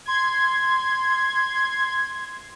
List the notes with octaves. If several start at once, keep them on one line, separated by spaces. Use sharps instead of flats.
C6 G#6